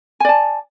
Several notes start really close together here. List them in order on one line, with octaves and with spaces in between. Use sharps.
G#5 D5 A5